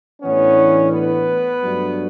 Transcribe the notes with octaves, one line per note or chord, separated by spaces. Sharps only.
A2 E3 B3 C#4 D4 C#5
B3 B4
G2 F#3 A3 D4